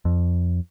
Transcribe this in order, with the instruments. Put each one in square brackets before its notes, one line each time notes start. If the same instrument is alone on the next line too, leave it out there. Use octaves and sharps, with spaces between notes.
[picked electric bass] F2